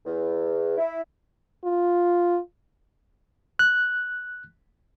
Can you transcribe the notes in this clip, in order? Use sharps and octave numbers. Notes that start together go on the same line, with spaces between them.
E2
E4
F4
F#6